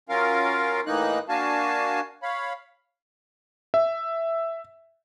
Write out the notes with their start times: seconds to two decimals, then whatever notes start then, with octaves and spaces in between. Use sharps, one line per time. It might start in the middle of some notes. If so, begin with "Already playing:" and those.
0.09 F#3 C#4 F4 A#4 F5
0.86 A2 E3 A#3 D#4 F#6
1.29 A#3 D4 F#4 F5 G#5 A5
2.23 C#5 F5 B5
3.74 E5